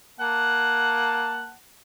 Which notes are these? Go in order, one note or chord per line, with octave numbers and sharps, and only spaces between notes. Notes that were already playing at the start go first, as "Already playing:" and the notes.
A#3 F#5 A5